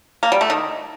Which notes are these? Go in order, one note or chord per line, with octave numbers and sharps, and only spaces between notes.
A#3
G3
A3
D#3